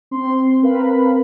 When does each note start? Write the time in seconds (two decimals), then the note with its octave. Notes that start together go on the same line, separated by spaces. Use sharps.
0.11 C4 C6
0.62 C4 A#4 B4 F5 B5